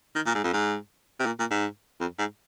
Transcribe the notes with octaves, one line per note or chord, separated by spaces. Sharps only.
D#3
A#2
G#2
F2
G#2
C3
A#2
A#2
G#2
F2
G#2